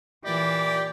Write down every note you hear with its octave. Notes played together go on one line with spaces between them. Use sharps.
A#2 E3 G4 D5